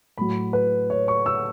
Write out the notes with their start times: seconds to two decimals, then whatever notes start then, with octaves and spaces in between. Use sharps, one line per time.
0.18 A2 F#3 B5
0.53 B4
0.90 C#5
1.08 C#6
1.26 E6